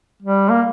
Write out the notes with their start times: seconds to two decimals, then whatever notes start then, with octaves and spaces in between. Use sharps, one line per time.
0.22 G3
0.49 A#3